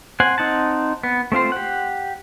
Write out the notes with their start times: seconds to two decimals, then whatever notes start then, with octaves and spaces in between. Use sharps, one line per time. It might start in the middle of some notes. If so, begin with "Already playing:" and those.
0.20 C4 C5 F#5 G#5
0.38 C4 D#4 F#5 A5
1.03 B3
1.32 A3 C4 F4 C5
1.52 G4 F#5